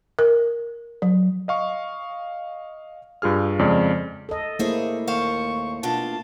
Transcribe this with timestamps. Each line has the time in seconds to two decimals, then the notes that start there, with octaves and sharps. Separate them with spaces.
0.19 A#4
1.02 F#3
1.48 D#5 F5 C#6
3.22 G2 F4 G#4 F6
3.59 F2 C#3 G#3 D5
4.29 A4 D#5
4.59 A3 A#3 E4 G#4 C5 C#5
5.07 D#2 C5 F5 C#6
5.83 B2 D4 F4 A5